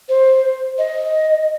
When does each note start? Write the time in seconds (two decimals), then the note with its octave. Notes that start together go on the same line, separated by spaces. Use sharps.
0.09 C5
0.78 D#5